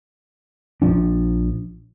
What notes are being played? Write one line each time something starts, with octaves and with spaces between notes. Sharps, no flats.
A#1 F3 D4